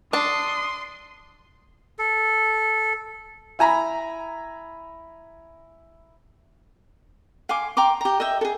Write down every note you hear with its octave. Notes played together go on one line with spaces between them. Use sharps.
D4 A5 C6 D#6
A4
E4 G#5 A#5 B5
F5 G#5 C6 D6
G5 A#5 C6 D6
G4 A#5
D#5 E5 G5
G#4 A4